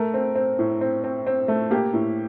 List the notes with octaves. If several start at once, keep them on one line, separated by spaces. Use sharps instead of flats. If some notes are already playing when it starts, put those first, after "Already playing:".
Already playing: A3 A#4
C4
C4
A2
C4
C4
C4
A3
A#3 G4
A2